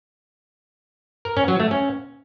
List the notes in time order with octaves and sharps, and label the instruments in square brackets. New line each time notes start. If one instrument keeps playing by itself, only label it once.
[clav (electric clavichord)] A#4
C#4
F#3
A3
C#4